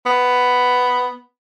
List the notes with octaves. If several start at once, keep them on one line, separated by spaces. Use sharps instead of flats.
B3